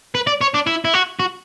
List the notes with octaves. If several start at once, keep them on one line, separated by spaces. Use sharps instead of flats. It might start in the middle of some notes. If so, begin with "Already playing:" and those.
B4
D5
C#5
D4
E4
E4
F#4
F#4